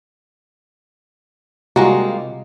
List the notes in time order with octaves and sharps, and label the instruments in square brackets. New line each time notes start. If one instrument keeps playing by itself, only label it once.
[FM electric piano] C3 [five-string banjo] D#3 G#3 A#3 [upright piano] G3 F4 [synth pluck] F#4